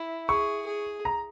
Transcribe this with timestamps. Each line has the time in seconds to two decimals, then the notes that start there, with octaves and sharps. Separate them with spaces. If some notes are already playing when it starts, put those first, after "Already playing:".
Already playing: E4
0.29 G#4 C#6
0.67 G#4
1.05 A#5